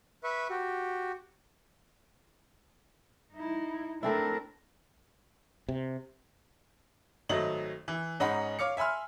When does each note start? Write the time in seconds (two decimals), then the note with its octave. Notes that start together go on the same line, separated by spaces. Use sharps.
0.24 B4 E5 C#6
0.50 F#4 G4
3.33 D#4 E4
4.03 A3 C4 D4 E4 A#4
5.69 C3
7.29 G#1 F#3 A3 D#5 F#7
7.88 E3
8.20 G#2 C#4 D#4 F#5 B5
8.59 C#5 F5 D6 C#7
8.77 E5 G#5 B5 C6 F6